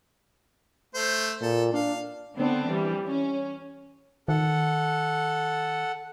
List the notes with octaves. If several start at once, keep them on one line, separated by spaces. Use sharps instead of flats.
A3 C5
A#2 A4
D4 F5
D3 B3 C4 D4
E3 G3
C#4
D#3 A4 F#5